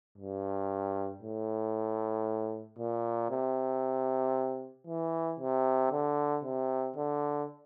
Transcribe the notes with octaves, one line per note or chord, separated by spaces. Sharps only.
G2
A2
A#2
C3
E3
C3
D3
C3
D3